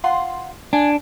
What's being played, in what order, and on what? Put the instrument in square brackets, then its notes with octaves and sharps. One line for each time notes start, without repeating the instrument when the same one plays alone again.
[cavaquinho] F4 F#5 C6
[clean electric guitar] D4 [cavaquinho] G#5